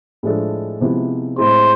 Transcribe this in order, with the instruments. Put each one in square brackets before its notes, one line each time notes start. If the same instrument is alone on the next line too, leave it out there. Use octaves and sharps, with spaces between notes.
[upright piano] A2 F3 G#3 D4 A4
C3 F3 G#3 B3 E4
[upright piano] A2 G#3 C4 E4 G#4 [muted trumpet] C5